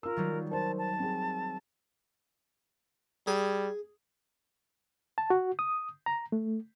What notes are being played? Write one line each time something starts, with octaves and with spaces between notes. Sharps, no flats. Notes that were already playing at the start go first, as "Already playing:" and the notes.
F4 A#4 E6
D#3 F#3 G3
A#4 C5 A5
A5
C4 G#4
G3 G#4
A5
F#4
D#6
A#5
A3